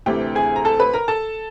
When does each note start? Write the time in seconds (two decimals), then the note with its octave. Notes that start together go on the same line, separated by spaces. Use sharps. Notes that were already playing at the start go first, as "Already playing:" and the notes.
0.06 D2 C3 E3 G4 G5
0.35 G#4 G#5
0.56 A#5
0.65 A4 A5
0.80 B4 B5
0.94 A#4 A#5
1.08 A4 A5